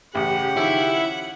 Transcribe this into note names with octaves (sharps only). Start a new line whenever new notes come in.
A1 C#3 G4 F#5
D#3 F3 C#4 E4